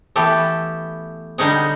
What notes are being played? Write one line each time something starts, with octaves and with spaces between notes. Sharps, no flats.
E3 A3 B3 G4 A4
D3 G3 G#3 D#4 G#4 F#5